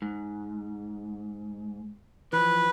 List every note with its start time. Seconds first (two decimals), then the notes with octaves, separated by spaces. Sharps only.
0.02 G#2
2.33 E3 F3 B4